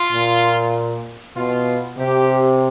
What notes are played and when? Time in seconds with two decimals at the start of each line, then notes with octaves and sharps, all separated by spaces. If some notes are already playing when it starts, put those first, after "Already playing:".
Already playing: F4
0.12 A#2
1.36 B2 F4
1.98 C3 G4